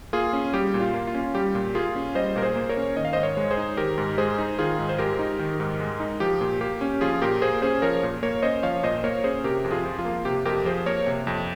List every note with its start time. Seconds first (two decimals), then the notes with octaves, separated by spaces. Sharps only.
0.13 A#3 F4 G#4
0.33 C#4
0.53 G3 G4
0.74 A#2
0.81 F4
0.94 A#3
1.07 F4
1.14 C#4
1.34 G3 G4
1.55 A#2
1.75 A#3 F4 G#4
1.95 C#4
2.15 G3 C5 D#5
2.36 A#2 A#4
2.42 G#4 C5
2.56 A#3
2.69 A#4 C#5
2.77 C#4
2.97 D#3 D#5
3.05 F5
3.13 G#2 C5 D#5
3.23 A#4 C#5
3.37 G#3
3.51 G#4 C5
3.57 D#4
3.77 D#3 G4 A#4
3.98 G#2
4.18 G#3 G#4 C5
4.38 D#4
4.58 D#3 F4 G#4
4.79 G#2
4.89 C5
4.98 G#3 G4 A#4
5.19 D#4
5.39 D#3
5.60 G#2
5.80 G#3
6.00 D#4
6.20 F3 G4
6.41 A#2
6.61 A#3 G4
6.81 C#4
7.01 F3 F4 G#4
7.22 A#2 G4 A#4
7.41 A#3 G#4 C5
7.62 C#4 G#4 C5
7.82 F3 A#4 C#5
8.03 A#2
8.23 A#3 A#4 C#5
8.43 C#4 C5 D#5
8.63 F3 C#5 F5
8.83 A#2 C5 D#5
9.04 A#3 A#4 C#5
9.24 C#4 G#4 C5
9.44 C3 G4 A#4
9.64 F2
9.71 F4 G#4
9.85 F3
9.99 F4
10.05 A#3
10.25 C3 G4
10.45 F2 G4 A#4
10.65 F3 G#4 C5
10.86 A#3 A#4 C#5
11.06 C3
11.27 F2